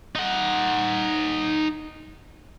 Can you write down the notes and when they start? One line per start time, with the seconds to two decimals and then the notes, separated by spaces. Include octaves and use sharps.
0.15 D#4 F#5